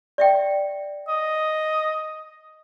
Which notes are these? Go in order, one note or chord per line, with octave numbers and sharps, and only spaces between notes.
D5 E5 G5
D#5